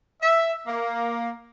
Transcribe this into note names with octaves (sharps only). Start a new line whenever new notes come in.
E5
A#3